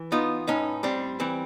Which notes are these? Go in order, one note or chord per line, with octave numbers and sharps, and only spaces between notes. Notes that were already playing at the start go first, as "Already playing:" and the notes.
Already playing: E3
B3 D#4 F4
A2 C#4 D#4
G3 C4 D4
E3 C4